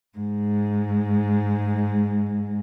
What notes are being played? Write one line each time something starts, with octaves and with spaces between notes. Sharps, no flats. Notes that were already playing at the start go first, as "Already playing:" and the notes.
G#2 G#3